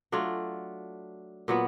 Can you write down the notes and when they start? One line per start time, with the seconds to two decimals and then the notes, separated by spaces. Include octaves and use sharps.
0.12 F#3 A3 D4 F4
1.48 A#2 F#3 B3